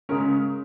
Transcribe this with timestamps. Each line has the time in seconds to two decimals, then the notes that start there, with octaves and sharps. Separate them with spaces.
0.09 C#3 G#3 C#4 A#4